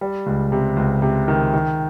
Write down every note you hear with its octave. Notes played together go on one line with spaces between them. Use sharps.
G3
C#2
C3
C#2
C3
D#3
D#3